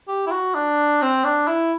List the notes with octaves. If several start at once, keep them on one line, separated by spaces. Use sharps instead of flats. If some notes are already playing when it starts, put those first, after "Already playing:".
G4
E4
F#4
D4
C4
D4
E4